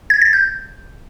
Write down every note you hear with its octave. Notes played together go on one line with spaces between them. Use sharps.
G#6
A6
G6